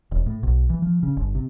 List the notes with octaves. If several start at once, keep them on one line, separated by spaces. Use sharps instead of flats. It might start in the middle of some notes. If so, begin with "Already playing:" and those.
E1
A2
B1
E3
F3
C#3
G1
C3